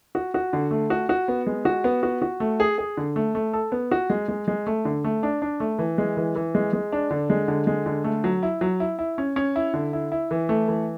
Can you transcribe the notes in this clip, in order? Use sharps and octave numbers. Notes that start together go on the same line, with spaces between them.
F#4
F#4
D3
A3
F#4
F#4
B3
G#3
F#4
B3
F#4
F#4
A3
G#4
G#4
D3
A3
A3
A4
B3
F#4
G#3
G#3
G#3
A3
D3
A3
D4
D4
A3
E3
G#3
E3
E3
G#3
G#3
D4
D3
G#3
D3
G#3
D3
A3
F#3
E4
F#3
E4
E4
C#4
C#4
E4
D3
E4
E4
E3
A3
E3